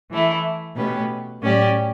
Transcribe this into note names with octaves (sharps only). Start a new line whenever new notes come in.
E3 A3 E4
B2 A3 C#4 G4 B4
A2 F#3 C#4 G4 D5